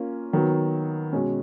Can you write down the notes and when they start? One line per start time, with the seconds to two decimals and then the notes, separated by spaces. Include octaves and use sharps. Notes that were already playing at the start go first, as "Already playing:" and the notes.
Already playing: A#3 C#4 F4
0.33 D#3 F#3 B3
1.13 B2 G#3 C#4